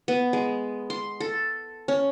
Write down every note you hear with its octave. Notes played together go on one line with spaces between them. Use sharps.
B3
G#3
C6
A4
C#4